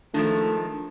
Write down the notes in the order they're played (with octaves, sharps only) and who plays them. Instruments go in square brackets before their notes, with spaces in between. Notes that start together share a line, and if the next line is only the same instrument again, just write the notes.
[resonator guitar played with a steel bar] D#3 F3 G#3 [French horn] A3 [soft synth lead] D4